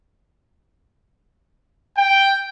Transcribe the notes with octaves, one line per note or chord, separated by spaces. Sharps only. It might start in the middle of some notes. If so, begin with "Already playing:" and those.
G5